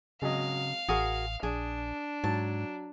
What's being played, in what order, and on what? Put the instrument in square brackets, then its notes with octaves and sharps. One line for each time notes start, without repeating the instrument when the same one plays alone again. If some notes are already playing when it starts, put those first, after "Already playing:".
[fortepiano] G#1 F#3 D#5 [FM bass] C#3 [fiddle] F5
[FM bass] A1 [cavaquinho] F#4 G#4 A#4 [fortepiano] D#6
[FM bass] A#1 [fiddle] D4 [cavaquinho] G#4
[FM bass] G#2 [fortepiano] F#3 [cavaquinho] A5